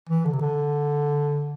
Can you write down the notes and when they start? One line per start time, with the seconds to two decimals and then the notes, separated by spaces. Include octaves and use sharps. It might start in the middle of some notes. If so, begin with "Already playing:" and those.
0.09 E3
0.25 D3
0.33 C3
0.41 D3